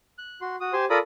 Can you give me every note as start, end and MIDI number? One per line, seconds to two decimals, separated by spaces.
0.18 0.40 90
0.41 0.56 66
0.41 0.56 84
0.60 0.73 66
0.60 0.73 87
0.73 0.85 67
0.73 0.85 72
0.73 0.85 80
0.73 0.85 84
0.90 0.98 65
0.90 0.98 69
0.90 0.98 70
0.90 0.98 74
0.90 0.98 83
0.90 0.98 87